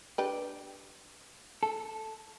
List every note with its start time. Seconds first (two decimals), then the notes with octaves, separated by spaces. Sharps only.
0.18 D4 G4 B4
1.63 A4